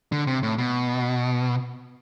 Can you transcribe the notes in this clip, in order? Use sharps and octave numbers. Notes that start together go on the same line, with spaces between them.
D3
C3
A2
B2